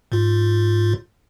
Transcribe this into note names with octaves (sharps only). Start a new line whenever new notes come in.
G#2 F4